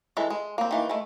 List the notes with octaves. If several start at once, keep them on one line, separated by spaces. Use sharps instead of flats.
E3 G#3 A4
G#3
A#3 C4
D#3 E3 A#3
G#3 A3